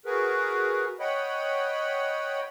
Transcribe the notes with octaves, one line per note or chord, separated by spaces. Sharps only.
F#4 G#4 A#4 B4
C#5 D#5 F#5 G5 B5